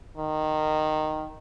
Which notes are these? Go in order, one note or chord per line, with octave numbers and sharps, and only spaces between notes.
D#3